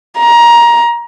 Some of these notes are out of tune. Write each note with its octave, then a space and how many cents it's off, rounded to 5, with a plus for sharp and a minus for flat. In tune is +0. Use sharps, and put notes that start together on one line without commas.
A#5 +20